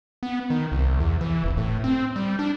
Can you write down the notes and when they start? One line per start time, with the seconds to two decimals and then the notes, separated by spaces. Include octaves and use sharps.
0.23 B3
0.50 D#3
0.72 C2
1.00 E2
1.21 E3
1.44 F1
1.57 A2
1.84 C4
2.16 G3
2.39 D4